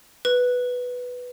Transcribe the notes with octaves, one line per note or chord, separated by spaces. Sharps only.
B4